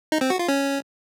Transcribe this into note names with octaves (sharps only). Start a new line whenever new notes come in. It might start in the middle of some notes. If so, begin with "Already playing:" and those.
D#4
C4
F#4
F4
C#4